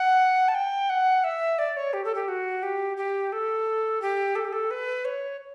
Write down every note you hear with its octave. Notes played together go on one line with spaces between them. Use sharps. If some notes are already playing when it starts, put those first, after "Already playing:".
Already playing: F#5
A5
G5
F#5
E5
D5
C#5
G4
A4
G4
F#4
G4
G4
A4
G4
A4
G4
A4
B4
C#5